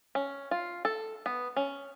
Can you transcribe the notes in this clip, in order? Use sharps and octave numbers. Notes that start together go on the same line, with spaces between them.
C#4
F4
A4
B3
C#4